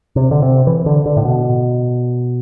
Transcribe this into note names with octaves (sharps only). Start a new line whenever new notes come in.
C3
D3
C3
E3
D3
D3
A2
B2